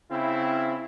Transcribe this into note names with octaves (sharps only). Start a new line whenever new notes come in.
C#3 C4 E4